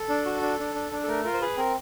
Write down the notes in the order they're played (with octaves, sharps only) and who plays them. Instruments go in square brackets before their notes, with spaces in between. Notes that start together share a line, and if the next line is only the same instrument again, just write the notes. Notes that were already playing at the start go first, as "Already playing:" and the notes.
Already playing: [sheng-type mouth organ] A4
D4
F#4
D4
D4
D4
D4
A4
A3 A#4
F4 A#4
C5
G#4 B4
C4 A#4